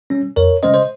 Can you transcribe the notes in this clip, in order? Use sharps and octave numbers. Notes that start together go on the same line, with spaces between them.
G3 C#4
F2 A#4 C#5
C#3 G#3 C#4 C5 D#5
C5